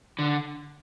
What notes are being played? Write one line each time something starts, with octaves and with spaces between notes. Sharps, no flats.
D3